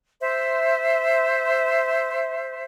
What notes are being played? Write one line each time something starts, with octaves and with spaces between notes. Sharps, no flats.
C5 E5